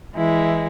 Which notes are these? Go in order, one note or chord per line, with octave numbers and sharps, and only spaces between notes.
E3 G#3 E4